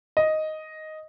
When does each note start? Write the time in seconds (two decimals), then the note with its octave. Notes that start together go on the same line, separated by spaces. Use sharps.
0.17 D#5